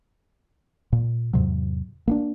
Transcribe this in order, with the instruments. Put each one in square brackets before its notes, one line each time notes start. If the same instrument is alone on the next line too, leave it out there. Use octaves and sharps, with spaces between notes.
[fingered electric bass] A#2
E2 G#2 C3 F#3
A#3 B3 D4